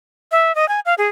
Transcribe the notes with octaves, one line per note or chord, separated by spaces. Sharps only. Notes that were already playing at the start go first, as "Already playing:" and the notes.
E5
D#5
G#5
F5
G#4